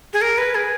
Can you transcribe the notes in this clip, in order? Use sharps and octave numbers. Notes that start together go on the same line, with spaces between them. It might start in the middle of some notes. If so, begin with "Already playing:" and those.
G#4
A#4
B4
G#4